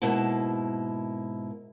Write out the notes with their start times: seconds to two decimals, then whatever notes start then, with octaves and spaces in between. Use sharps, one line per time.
0.02 G#2 B2 A#3 E4 A5